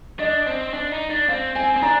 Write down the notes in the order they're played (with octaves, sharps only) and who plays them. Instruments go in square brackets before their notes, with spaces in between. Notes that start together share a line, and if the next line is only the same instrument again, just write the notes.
[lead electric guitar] D4 [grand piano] D#5
[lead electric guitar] C4
D4
D#4
D4
[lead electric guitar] C4 [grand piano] F5
[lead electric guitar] C4 [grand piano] G#5
[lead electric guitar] C4
[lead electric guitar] D4 [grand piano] A#5